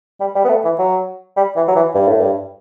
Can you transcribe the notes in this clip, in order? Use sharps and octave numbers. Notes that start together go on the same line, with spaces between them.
G3
G3
B3
A3
E3
F#3
G3
E3
F#3
E3
G2
A2
G2